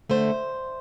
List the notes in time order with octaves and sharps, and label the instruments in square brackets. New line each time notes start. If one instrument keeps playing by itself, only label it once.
[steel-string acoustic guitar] D3 A3 C5